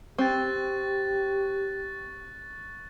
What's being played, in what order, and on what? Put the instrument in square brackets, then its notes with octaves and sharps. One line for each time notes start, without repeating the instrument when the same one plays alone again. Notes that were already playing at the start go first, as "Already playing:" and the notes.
[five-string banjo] C4 [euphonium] G4 [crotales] C#6 F#6 A6